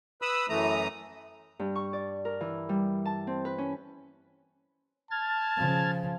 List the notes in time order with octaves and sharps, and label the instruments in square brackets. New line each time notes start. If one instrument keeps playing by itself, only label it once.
[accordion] B4 B5 D#6 E6
F#2 E3 A3 A#5 D#6
[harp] G2
C#6
D5
A#4
E3
G3
A5
C4
B4
C#4
[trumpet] A5 [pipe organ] F6 G#6 A6
[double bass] C#3 F3